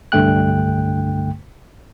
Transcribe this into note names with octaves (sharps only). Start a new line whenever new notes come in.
C2 G2 D3 A3 G5 F#6